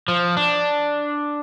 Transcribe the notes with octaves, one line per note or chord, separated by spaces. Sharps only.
F3
D4